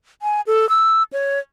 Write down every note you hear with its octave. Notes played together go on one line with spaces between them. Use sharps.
G#5
A4
E6
C#5